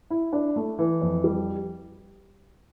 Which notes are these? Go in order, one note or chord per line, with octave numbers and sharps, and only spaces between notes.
E4
D4
A3
E3
F2
G3